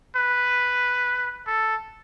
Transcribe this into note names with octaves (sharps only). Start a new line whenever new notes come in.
B4
A4